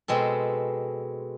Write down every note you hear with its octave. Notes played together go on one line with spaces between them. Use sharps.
B2 G#3 C4 A4